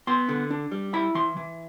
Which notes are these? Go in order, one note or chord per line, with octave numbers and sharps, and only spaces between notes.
B3 C6
D3
D4
G3
E4 B5
E3 C6
E3